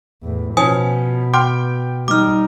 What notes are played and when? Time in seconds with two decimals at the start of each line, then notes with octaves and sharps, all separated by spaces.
0.23 E2 A2
0.57 B2 F3 B3 C#4 G#5 D#6
1.34 G5 C6 D6 F6
2.08 G3 D#4 D6 F6